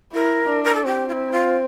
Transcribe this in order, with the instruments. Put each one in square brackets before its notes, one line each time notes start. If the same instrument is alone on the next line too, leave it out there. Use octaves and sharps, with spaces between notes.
[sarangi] E4 [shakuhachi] A#4
[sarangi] D4
[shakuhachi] A#4
A4
[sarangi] C4 [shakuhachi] G4
[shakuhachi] F4
E4
F4